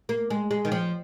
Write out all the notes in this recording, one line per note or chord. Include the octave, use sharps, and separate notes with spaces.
A#3
G#3
G#3
D#3
F3